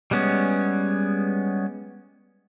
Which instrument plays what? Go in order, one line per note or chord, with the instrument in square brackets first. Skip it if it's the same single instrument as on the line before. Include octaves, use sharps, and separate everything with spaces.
[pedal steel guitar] G3 G#3 B3 C#4